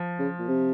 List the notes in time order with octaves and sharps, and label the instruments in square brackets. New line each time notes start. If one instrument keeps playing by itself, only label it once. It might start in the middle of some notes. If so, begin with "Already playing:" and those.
Already playing: [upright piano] F3
[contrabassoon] C#3
A#2
C3